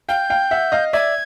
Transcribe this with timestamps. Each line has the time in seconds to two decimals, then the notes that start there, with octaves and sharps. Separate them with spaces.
0.09 F5 G5 G6
0.30 F5 G5
0.51 E5 F#5
0.72 D#5 F5
0.93 D5 E5 G#6